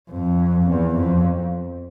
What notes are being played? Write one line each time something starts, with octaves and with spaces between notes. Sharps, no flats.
F2
E2
F2